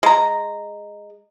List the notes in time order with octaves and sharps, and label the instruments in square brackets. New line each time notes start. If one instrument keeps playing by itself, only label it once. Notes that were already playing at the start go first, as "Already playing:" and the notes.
[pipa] G#3 A#5